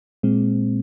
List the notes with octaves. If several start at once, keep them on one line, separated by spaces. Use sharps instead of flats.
A#2 G#3 C4